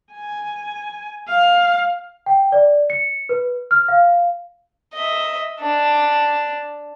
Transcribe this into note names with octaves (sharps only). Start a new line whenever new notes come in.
G#5
F5
G5
D5
C#7
B4
F6
F5
D#5 E5
D4